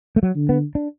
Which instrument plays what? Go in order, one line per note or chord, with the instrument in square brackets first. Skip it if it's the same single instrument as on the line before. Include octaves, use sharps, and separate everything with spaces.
[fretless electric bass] A3
F#3
[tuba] D3
[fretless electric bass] B3
D4